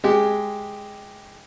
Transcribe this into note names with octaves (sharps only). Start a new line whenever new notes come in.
G#3 G4